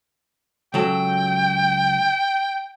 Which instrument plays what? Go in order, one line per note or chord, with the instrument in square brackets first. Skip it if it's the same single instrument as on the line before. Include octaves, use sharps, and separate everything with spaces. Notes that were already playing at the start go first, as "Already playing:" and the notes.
[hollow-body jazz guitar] C#2 F#3 A4 [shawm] G5